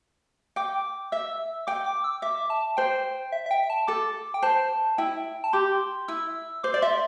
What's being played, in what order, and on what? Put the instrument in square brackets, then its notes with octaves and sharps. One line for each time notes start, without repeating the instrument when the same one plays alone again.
[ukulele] G5 [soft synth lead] D6
[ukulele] E5 [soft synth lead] E6
[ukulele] G5 [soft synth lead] D6
[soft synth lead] D6
E6
[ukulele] E5 [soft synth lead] D6
[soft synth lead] A5
[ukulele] C5 [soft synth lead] G5
[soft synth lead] E5
E5
G5
A5
[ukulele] A4 [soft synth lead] D6
[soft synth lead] G5
[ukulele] C5 [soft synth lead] A5
[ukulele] E4 [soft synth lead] G5
[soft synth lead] A5
[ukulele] G4 [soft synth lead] C6
[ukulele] E4 [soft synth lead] E6
[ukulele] C5 [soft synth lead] D6
[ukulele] D5
[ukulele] E5 [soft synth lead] C6